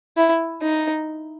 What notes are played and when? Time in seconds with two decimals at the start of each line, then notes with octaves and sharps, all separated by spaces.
0.17 E4
0.62 D#4